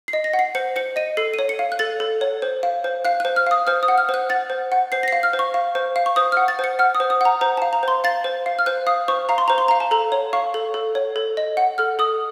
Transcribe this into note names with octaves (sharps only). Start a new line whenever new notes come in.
C7
D#5
A#6
F#5
C7
C5 C#7
C5 C#7
D#5 D#7
A4 C7
D#7
C#5
C#7
F5
F#6
A4 A6
A4
C#5
C5
F5
C5
F5 F#6
F#6
C5
F6
F5 D#6
C5 F6
D#6
F#5
F6
C5
F#6
F#5 A6
C5
F#5
C5 C7
A#6
C7
F5
F6
C5
C#6
F5
C5
F5
C#6
C5 D#6
F6
F#5
A6
C5 C#7
F#5 F6
D#6
C5
D#6
F#5 A#5
C5 A#5
A5
F5
A#5
C5 C6
F5 A6
C5
F5
F6
C5 F#6
F5 D#6
C5 C#6
F5 A#5
C6
C5 A#5
C6
A#5
F5
A5
A4 A#5
C#5
F5 C#6
A4
A4
C#5
A4
D#5
F#5
A4 F6
A4 D#6